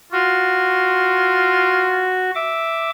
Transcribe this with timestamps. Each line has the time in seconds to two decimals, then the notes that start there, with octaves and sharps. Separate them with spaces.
0.12 F4 F#4
2.35 E5 D6